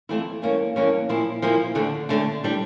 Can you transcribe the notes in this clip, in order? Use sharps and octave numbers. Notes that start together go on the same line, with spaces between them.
F2 E3 A3 E4
G2 E3 A#3 C#4
G2 E3 A#3 C#4
A#2 F3 A#3 E4
A#2 F3 A#3 E4
D2 D3 A3
D2 D3 A3
E3 G3 D4